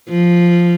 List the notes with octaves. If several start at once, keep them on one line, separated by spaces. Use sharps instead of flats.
F3